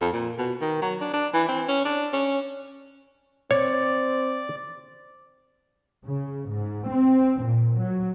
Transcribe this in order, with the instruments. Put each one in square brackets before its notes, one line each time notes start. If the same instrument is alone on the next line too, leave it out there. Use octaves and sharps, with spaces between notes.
[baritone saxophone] F2
A#2
B2
D#3
F#3
D4
D4
E3
C4
C#4
D4
C#4
[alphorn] C4 [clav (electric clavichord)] C#5 [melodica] D5
[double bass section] C#3
G#2
C4
A#2
F#3